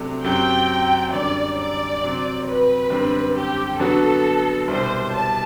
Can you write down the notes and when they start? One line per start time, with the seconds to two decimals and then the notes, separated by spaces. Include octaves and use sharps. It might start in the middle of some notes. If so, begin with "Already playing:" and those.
Already playing: C3 F#3 A3 D4
0.23 F#2 F#3 C4 G4 G5
1.12 F#2 D3 G3 D5
1.57 D5
2.02 C3 F#3 C4
2.46 B4
2.90 F#2 D3 G3 C4
3.35 G4
3.79 D3 F#3 B3 F#4 A4
4.68 C2 B2 G3 C5
5.13 A5